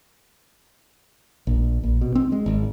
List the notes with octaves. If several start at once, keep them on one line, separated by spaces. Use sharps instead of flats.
A#1
A#1
B2
C4
G#3
G#1